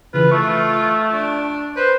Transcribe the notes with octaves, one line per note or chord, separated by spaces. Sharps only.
C#3 E3 F4 B4
A3 C#6
D4
B4 C5